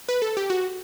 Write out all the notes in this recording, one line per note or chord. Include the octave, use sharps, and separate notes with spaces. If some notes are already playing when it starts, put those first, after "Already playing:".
B4
A4
G4
F#4